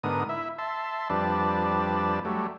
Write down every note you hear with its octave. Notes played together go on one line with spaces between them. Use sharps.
G#2 D3 B3 A#4 D#6
E4 E5
E5 A5 C6
F2 G3 D4 B4 A5
F#3 G3 A3